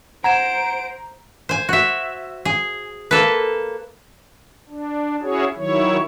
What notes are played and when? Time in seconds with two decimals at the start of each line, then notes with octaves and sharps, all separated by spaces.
0.24 C5 F#5 A#5 G#6 D7 E7
1.49 C5 G#5
1.69 F#4 E5
2.45 G#4
3.11 A#3 A4 B4
4.69 D4
5.22 C#4 E4 F#4 G#4 C#5
5.56 D#3 F#3 E4 C#5